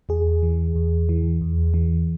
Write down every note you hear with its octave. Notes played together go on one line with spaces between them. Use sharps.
E2 G#4
E3
E2
E3
E2
E3